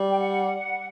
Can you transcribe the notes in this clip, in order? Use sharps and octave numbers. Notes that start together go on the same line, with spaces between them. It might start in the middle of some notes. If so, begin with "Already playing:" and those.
Already playing: G3
G5
F#5